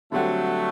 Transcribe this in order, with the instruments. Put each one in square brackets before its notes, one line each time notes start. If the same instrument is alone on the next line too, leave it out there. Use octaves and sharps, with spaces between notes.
[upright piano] D3 G3 C4 F#4 [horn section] F#3 A3